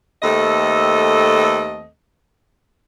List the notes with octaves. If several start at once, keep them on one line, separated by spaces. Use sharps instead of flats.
D#2 A3 C4 A4 D#5